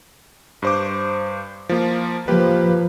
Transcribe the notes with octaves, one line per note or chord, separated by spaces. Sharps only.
G2 C5 D6
F3 A#3 F4
F3 A#3 G4 B4